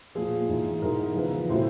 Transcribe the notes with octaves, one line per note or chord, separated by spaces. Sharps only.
A#2 F3 G#4
G#2 E3
G#2 E3 A#4
E2 C#3 F3 B4
A2 E3 C5